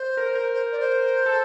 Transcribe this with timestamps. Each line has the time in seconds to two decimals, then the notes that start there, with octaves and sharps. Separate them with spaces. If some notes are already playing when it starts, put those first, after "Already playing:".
Already playing: C5
0.17 A#4
0.35 A#4
0.53 C5
0.72 D5
0.80 C5
1.26 A4